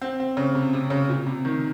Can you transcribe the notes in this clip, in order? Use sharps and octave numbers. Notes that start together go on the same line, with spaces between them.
C4
C4
C#3
C3
C3
C#3
A#2
C3
D#3